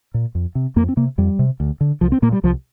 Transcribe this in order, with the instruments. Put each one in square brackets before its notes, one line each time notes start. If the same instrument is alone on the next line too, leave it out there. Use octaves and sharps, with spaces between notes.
[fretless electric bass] A#2
F2
C3
F2 A#3
C4
C3 A#3
F2 G3
C3
D2
D3
C2 F3
C4
A#2 A#3
G3
C2 F3